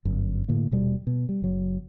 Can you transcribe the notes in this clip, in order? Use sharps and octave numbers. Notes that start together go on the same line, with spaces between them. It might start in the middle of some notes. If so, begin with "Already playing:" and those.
G1 F#2
A2 D3 A#3
D#1 B2 G3
B2
G3
F#1 F#3